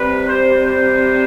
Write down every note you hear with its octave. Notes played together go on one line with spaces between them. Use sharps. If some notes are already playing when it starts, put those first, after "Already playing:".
Already playing: C3 G3 B4
C5
C5